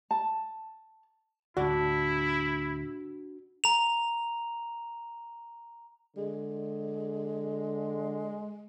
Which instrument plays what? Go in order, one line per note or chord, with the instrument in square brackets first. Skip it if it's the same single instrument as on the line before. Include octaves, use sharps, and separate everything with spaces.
[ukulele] A5
[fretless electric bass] D2 A2 [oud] D4 [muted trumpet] E4 [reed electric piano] F#4
[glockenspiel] A#5 F7
[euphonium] D3 [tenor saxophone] G#3